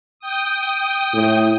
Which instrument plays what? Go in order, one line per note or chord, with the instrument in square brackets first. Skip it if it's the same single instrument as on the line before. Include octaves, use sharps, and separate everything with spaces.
[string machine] G5 D#6
[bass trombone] A2